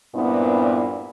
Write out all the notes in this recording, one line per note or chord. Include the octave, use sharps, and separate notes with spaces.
G2 A#2 B3 C4 E4